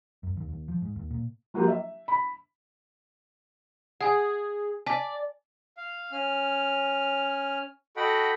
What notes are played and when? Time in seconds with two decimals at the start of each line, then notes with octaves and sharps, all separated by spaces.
0.23 F#2
0.37 D#2
0.49 D#2
0.68 F3
0.82 G#2
0.96 D#2
1.11 A#2
1.54 F3 F#3 A#3 F4 G4
1.68 E5
2.08 B5
4.01 G#4 F#5 G#5
4.86 D5 G#5 A5 B6
5.77 F5
6.12 C#4 F6
7.97 F#4 A4 D#5 F#5 G5 B5